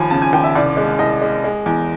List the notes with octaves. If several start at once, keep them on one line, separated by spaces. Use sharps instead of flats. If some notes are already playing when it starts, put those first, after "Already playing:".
Already playing: D#2 F3 G#5 B5
C#3 A5
G#5
D#2 G5
E5
C2 D5
G#3
C2 D#5
G#3
G#3
E2